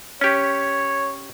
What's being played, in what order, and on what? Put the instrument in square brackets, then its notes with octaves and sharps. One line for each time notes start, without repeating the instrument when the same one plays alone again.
[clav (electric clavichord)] C#4 G4 [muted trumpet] C#5